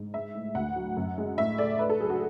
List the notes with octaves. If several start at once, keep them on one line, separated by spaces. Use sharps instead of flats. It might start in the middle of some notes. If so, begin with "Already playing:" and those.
Already playing: G#2
G#3 E5
A2
D2 F#5
F#3
F#2
G#3
A2 E5
A3 D5
A3 B4
A4
F#3 G#4
F#4